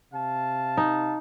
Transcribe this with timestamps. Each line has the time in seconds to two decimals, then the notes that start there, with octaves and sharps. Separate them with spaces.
0.14 C3 F5 A5
0.77 D#4